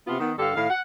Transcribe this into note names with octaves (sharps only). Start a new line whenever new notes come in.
C3 B3 F4
D#3 B3
G2 D3 G4 A4 F5
A2 D#3 F5
F#5